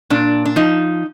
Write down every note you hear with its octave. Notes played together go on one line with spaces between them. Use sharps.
A#2 D4
D4
F3 D#4